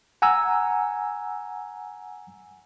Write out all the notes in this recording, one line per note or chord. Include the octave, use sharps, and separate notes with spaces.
F#5 G#5 A#5 E6